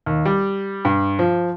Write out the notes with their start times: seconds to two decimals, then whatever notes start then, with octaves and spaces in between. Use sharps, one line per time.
0.06 D#2
0.25 G3
0.85 G2
1.19 F3